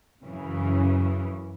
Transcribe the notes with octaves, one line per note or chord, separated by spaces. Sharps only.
F#2 C#3 E3